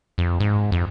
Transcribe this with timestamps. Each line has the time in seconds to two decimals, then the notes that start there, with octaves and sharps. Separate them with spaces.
0.18 F2
0.40 G#2
0.72 F2